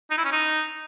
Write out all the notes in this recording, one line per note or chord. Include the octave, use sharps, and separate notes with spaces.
D#4
E4
C#4
D#4